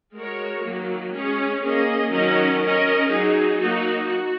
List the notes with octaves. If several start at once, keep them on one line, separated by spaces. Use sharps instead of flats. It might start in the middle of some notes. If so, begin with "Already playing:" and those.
G#3 F#4 A#4 C#5
D#3 F#3 A#3
G#3 C#4 G#4 C#5
A#3 C#4 G#4 D#5
D#3 F#3 C#4 A#4 D#5
C#4 A#4 D#5
F#3 D#4 G#4
F#3 A#3 D#4 F#4
F#4